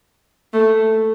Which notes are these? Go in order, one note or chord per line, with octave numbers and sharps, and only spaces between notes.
A3